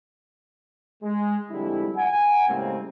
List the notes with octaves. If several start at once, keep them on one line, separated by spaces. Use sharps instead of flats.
G#3
F2 D3 G3 G#3 E4
F#5 G#5
A2 C#3 G3 G#3 A#3 C4